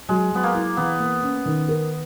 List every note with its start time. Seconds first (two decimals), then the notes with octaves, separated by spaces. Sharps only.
0.09 F#3 G#3
0.32 F#3 B3
0.43 A#3
0.54 E4
0.77 E3 B3
1.00 A#3
1.22 C#4
1.46 D#3
1.68 A#4